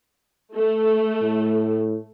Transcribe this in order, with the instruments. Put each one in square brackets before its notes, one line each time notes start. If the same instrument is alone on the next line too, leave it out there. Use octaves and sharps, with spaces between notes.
[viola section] A3
[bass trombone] A2